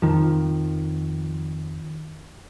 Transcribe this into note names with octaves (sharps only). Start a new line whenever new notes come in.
F2 D#3 F3